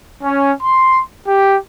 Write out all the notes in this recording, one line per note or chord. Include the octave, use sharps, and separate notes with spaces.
C#4
C6
G4